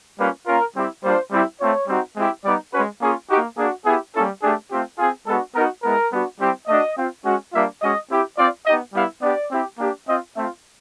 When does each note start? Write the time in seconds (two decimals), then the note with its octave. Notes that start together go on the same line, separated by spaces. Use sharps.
0.18 G3 A#3 C#4 F4 B4
0.46 A#3 C#4 F4 A#4
0.75 G3 C4 E4 G4
1.03 G3 A#3 D4 F4 C5
1.31 G3 C4 E4 G4
1.59 A3 C4 F4 C#5
1.87 G3 C4 D#4 F#4
2.16 G#3 C4 E4 G4
2.44 G3 B3 D#4 D5
2.73 G#3 C#4 F#4 B4
3.01 A#3 C#4 F4 G#4
3.29 A#3 D#4 F#4 G4
3.57 A#3 D4 F#4 G#4
3.85 B3 E4 G4 G#4
4.14 G3 A#3 C#4 E4 A4
4.42 A3 D4 G4 G#4
4.70 A3 C4 F4 G4
4.98 C4 F4 G#4
5.27 G#3 B3 D4 F#4 A4
5.55 B3 D#4 F#4 A#4
5.83 G#3 B3 E4 A#4
6.12 G3 B3 D4 F#4
6.40 G3 C4 E4 G4
6.67 A3 D4 F#4 D#5
6.97 C4 F4
7.24 G#3 C#4 F#4
7.53 G3 A#3 D4 F4 E5
7.81 G#3 C#4 F#4 D#5
8.09 C4 E4 G4
8.37 C4 F4 D5
8.65 B3 D#4 G4 D#5
8.93 G3 B3 E4 G4 F5
9.22 B3 D4 G4 D5
9.51 C4 E4 G4
9.78 A#3 D4 G4
10.07 C4 F4 D#5
10.36 A3 C4 F4 E5